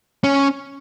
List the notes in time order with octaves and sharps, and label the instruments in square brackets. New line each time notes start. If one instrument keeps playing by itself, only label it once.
[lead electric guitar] C#4